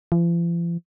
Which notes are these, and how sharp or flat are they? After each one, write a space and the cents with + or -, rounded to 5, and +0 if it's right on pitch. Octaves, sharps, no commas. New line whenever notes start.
F3 -45